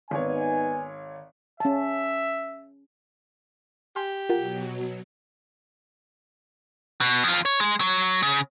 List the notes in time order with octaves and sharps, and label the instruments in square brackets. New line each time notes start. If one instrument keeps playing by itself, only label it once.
[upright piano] G#1 C#5 [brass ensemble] B3 D#4 G#5
[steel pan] C#4 A5 [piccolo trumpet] E5
[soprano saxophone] G4 [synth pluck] G#5 C6 F6
[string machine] B2 F#3 [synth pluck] F4 A#4 F#5
[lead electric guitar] B2
F2 F4
C#5
G#3
F#3
C#3